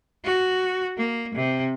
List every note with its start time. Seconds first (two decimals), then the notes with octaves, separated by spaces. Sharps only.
0.24 F#4
0.97 A#3
1.35 C3